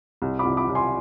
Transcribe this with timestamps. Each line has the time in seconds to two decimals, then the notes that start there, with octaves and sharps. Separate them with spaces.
0.22 C2
0.39 B5 D6
0.45 C2
0.57 B5 D6
0.69 C2
0.75 G#5 C6